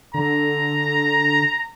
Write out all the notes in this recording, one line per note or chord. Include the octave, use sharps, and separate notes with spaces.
D3 A#5